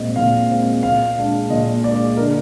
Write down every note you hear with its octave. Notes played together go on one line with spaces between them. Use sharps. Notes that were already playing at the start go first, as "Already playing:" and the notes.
Already playing: A#2 G#3 C4 D#5
A#2 F5
G#3 C4
A#2 F5
G#3 D4
A#2 D#5
G#3 D4 D5
D3 A#4